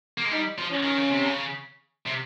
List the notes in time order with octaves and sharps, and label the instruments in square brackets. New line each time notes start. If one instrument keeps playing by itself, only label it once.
[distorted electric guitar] A#3
G#3
[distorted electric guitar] G3 [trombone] D#4
[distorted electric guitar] F3
[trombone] C#4
[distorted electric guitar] D#3
C#3
C3
C#3
C3